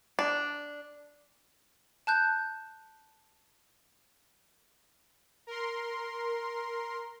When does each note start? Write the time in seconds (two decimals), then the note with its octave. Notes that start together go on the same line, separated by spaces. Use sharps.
0.19 D4
2.07 A5 F#6 G6
5.47 A#4 C6